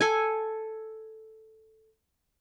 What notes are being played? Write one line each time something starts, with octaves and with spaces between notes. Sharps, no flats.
A4 G#5